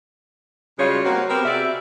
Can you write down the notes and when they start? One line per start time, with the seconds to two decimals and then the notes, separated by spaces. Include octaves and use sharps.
0.79 C#3 G3 G#3 F4 F#4 C#5
1.05 A#3 C4 F#4
1.29 B3 C4 G4 A#4
1.45 C3 F#4 G#4 D5 E5